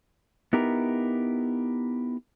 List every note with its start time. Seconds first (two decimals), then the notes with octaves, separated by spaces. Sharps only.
0.53 B3 D#4 E4 G4 A#4